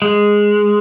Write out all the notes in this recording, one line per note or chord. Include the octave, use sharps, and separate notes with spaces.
G#3